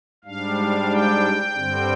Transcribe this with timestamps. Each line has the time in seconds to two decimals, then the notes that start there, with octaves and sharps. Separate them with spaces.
0.25 G#2 G3 D4 F5
0.90 G5
1.55 G2 D3 G3 C4